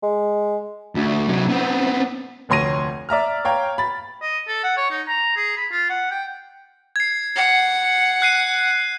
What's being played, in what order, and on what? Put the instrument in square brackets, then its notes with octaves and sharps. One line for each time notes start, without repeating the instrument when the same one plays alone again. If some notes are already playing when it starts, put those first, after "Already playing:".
[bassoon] G#3
[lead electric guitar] D2
C3 F#3
B3 C4
[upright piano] F1 D2 C#5 C6 A#6 D#7
D5 E5 A#5 F6
C#5 F5 G5 A#5
B5 A6
[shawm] D#5
A4
F#5
C#5
D#4
A#5
G#4
B5
F4
F#5
G5
[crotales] G#6 C7
[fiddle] F#5
[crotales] F#6 C7 D#7